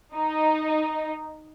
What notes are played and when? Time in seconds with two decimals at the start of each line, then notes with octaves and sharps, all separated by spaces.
0.14 D#4